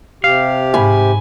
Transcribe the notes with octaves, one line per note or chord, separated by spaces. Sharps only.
C3 G4 F5
G#2 G#5 B5